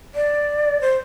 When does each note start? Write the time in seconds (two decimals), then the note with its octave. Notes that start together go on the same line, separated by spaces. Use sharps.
0.15 D5
0.81 C5